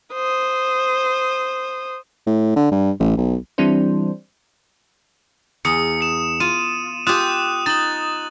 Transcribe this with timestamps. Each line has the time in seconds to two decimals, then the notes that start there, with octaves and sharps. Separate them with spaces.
0.13 C5 D#6
2.27 A2
2.56 D3
2.71 G2
3.00 A1
3.17 B1
3.58 E3 G3 C4 D4 E4 C5
5.65 E2 D#6 C#7
6.01 C#7 E7
6.40 F4 D#7
7.07 F4 G4 D#6 F#6 E7
7.66 D#4 A6 F#7